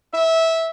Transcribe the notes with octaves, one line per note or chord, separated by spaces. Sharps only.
E5